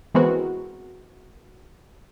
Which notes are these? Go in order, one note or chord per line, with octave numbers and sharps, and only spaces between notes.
E3 G#3 B3 C4 F#4 A#4